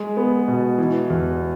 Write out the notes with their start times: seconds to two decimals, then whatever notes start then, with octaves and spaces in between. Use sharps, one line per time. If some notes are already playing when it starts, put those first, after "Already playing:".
Already playing: G#3
0.17 B3
0.48 B2
0.78 E3
1.10 E2